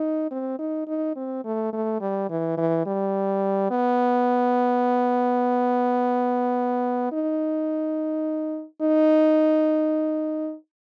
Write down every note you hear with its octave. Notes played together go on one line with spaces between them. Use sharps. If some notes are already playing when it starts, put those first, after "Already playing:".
Already playing: D#4
C4
D#4
D#4
C4
A3
A3
G3
E3
E3
G3
B3
D#4
D#4